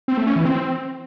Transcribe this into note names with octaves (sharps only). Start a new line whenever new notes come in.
C4
A3
C#4
E3
C4